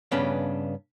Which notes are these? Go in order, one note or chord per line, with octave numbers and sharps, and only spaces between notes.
G2 C#3 B3 C#4 D4